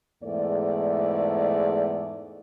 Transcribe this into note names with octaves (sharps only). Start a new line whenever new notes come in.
E2 G#2 A3 D5